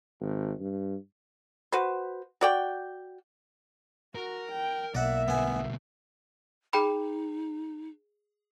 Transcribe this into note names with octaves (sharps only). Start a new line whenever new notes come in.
G#1
G2
F#4 B4 C5
F#4 D5 G5
F#4 A#4
G5
B1 A#3 D5 E5 F#5
D2 B2 B3 G#5
D#4 G#4 G5 B5